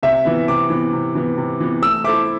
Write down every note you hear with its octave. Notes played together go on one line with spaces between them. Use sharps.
C3 E5
E3 B3
C3 D6
E3 B3
C3
E3 B3
C3
E3 B3
A3 E6
E4 A4 C5 E5 D6